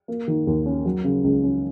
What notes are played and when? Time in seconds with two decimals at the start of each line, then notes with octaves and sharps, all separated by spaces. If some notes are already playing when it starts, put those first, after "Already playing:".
0.08 A#3
0.28 D#3
0.47 D#2
0.66 C#4
0.85 F#3
1.04 C#3
1.24 C#2
1.43 C#4